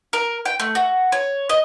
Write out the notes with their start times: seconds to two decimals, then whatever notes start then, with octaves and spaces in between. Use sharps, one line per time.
0.13 A#4
0.45 G5
0.60 A3
0.75 F#4
1.12 C#5
1.49 D#5